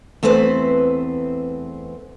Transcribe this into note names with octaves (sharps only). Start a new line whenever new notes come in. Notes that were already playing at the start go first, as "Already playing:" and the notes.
E2 A3 C4 B4 C5